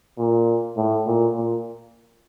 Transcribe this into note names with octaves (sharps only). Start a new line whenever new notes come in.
A#2
A2
A#2
A#2